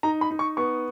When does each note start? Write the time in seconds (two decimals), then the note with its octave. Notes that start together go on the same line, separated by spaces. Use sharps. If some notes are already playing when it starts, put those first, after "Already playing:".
0.03 D#4 A#5
0.21 B5
0.31 D#4
0.39 C#6
0.57 B3 C#6